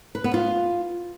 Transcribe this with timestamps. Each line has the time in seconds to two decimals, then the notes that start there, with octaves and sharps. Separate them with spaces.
0.15 B4
0.24 B3
0.34 F4